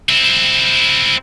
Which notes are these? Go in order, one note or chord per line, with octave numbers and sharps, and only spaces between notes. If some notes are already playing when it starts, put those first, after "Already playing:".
C4 E4